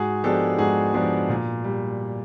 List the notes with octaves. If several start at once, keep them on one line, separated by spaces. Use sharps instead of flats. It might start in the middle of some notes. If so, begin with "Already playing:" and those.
Already playing: G#2 F#4 G#4
F3 G#3 B3 D4 G4 A4
G#2 F#4 G#4
F3 G#3 B3 D4
A#2
G3